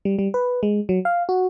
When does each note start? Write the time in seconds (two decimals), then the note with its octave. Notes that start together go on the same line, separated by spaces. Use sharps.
0.05 G3
0.19 G3
0.34 B4
0.63 G#3
0.89 F#3
1.05 F5
1.29 F#4